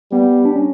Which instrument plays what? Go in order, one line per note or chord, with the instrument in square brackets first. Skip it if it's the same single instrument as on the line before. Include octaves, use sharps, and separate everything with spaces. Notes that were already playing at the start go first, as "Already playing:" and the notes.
[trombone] G3 [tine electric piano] B3
[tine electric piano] D4
C#4